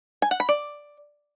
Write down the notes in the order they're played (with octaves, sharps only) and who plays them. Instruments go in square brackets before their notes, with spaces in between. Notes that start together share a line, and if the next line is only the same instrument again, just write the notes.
[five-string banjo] G#5
F#5
B5
D5